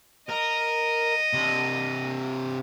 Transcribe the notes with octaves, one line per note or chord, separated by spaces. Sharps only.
A#4 D#5
C3 D4